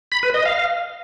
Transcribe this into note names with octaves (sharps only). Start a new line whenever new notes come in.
B5
B4
D#5
F5